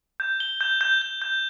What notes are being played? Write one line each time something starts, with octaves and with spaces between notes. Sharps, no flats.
G6
G7
G6
G6
G6
G6